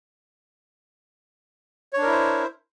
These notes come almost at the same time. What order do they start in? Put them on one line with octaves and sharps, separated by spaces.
C#5 D4 A#4 E4 C5